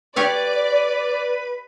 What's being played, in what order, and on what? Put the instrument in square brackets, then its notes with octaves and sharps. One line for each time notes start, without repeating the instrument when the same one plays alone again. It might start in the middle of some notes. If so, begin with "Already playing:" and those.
[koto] G4 C#5 F5 [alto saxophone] B4 [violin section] D5